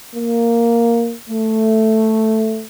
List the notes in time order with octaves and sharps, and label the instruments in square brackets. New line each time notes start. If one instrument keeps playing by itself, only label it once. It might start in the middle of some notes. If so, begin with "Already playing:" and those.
[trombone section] A#3
A3